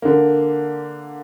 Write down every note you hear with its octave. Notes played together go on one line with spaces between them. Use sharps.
D3 A#3